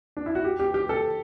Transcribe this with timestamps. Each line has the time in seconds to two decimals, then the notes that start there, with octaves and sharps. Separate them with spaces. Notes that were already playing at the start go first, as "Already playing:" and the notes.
0.17 D4
0.26 E4
0.35 F#4
0.45 G4
0.59 G4
0.74 G4
0.89 A4